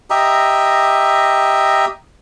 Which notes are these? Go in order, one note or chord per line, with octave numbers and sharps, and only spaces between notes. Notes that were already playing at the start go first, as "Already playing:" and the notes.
G4 D#5 E5 A#5